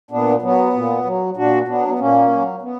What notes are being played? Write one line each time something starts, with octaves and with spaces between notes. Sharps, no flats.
A#2 B3 D4
F#3 B3
A#2
F#3
A#2 D4 F#4
F#3 B3 D4
B3
A#2 A#3 C#4
F#3
B3